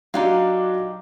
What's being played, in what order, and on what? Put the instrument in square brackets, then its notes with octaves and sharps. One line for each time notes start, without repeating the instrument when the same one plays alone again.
[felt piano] F#3 D4 F4 [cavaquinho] D#4 G4 F5